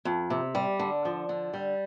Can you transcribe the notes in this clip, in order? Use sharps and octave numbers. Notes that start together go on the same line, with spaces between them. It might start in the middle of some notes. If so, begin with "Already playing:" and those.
F2
C3
G3
D3
F3
D3
G3